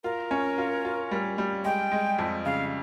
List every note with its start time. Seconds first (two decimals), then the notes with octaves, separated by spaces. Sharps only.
0.04 F4 A#4
0.31 C#4
0.58 F4
0.85 F4
1.11 G3
1.38 G3
1.64 G#3 G5
1.91 G#3
2.19 F2
2.46 C#3 F5